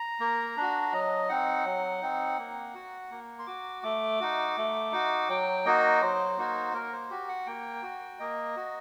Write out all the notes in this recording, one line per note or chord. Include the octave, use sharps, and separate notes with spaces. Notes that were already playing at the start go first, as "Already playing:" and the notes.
Already playing: A#5
A#3
D4 F#4
F#3 D#5
C4 D#4 F#5
F#3
C4 D#4
A#3
F#4
A#3
C6
F#4 D6
A3 D6
D#4 F#4
A3
D#4 F#4
F#3 G5
A#3 D#4 F#4 D#5
F#3 C5
A#3 D#4 F#4
A#3 A#4
C5
F#4 G4
F#5
A#3 G5
F#4
A#3 D#5
F#4